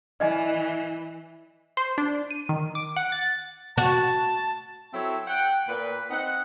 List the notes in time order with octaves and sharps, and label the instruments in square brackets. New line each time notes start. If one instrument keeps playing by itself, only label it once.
[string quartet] E3 [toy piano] D5 D#5 G#5
[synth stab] C5
D4
D#7
D#3
D6
F#5
A6
[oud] F#4 [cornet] A5
[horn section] F#3 C4 E4 A4 C#5 E5
F#5 G5
A#2 B4
C4 D#4 F#5